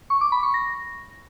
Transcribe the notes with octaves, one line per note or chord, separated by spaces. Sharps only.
C#6
D6
B5
C#6
A#6